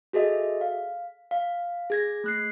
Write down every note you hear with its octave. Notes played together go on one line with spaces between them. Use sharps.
F#4 G#4 A4 D#5 E5
F5
F5
G#4 G#6 A#6
A3 F#6 C7